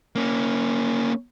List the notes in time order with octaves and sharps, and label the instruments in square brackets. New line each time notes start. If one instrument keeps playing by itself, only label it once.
[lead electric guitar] A#3 C#4